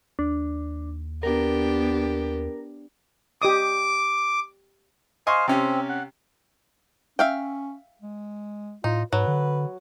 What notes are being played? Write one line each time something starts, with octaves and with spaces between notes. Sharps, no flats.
D#2 D4
B3 D4 G4 A#4
G4 D#5 D6 D#6
C5 D#5 F5 G#5 C#6
C3 C4 C#4 G4
F#5
C#4 E5 F5 G5
G#3
A2 D#4 F4
G#2 F#3 B4
D3